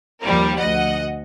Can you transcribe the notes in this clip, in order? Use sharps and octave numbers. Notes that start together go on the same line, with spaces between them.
D#2 F3 G3 A#4
D2 D#5 F#5